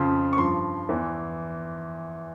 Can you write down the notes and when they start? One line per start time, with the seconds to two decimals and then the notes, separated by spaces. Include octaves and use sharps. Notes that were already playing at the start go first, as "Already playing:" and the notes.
Already playing: F2 C#3 F3 C6
0.33 C#6
0.37 G2 F3 C6
0.89 E2 E3